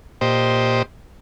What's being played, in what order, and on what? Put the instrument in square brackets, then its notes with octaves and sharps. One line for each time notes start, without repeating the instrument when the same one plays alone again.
[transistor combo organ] A#2 G4 C5 D#5